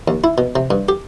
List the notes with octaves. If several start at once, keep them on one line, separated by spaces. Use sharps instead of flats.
D#2
E4
B2
C3
G2
G4